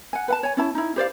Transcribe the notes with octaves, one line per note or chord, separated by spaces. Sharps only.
F#5 G#5
B4 F#5 A5
C#5 G#5
C#4 E4 A5
D#4 E4
G4 C5 D5 F5